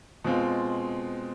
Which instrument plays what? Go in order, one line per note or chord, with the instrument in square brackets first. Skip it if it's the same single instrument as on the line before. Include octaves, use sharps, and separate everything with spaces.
[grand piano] B2 G#3 C4 F4